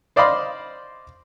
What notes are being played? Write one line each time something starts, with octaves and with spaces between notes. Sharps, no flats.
C5 D5 D#5 F5 B5 C6